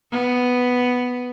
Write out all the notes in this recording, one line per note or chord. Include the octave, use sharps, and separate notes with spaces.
B3